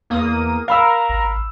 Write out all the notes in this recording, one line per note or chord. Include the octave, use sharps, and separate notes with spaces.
E2 A#3 D#6
A#4 F5 B5 E6
G#1